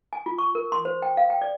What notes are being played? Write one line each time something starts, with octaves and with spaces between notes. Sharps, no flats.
G#5
F4
C#6
A#4
C6
C5
G5
F5
G5
D5